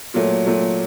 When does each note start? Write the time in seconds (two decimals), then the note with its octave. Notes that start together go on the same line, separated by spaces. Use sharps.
0.14 A#2 F#3 A3
0.46 A#2 F#3 A3